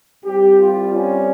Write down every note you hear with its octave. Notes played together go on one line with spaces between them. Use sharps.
C2 C3 G3 G4
F4
C#4